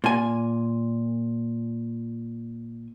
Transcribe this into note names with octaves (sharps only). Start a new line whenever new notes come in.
A#2 G#5